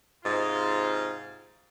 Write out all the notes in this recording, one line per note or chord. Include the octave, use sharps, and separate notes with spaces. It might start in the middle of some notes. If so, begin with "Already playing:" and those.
G#2 C3 F4